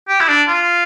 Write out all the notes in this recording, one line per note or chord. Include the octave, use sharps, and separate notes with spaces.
G4
E4
D4
F4